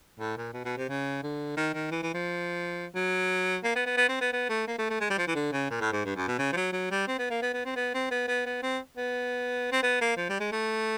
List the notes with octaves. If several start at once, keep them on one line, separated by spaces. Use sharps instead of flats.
A2
A#2
B2
B2
C3
C#3
D3
D#3
D#3
E3
E3
F3
F#3
A#3
B3
B3
B3
C4
B3
B3
A3
A#3
A3
A3
G#3
G3
F3
E3
D3
C#3
A#2
A2
G#2
G2
F#2
B2
C#3
F3
F#3
F#3
G3
C4
B3
A#3
B3
B3
C4
B3
C4
B3
B3
B3
C4
B3
C4
B3
A#3
F3
G3
G#3
A3